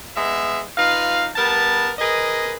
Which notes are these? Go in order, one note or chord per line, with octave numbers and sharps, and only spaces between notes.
G#3 B3 D#5 E5
D#4 F4 B4 F5
G3 B3 A#4 A5
G#4 A#4 B4 D#5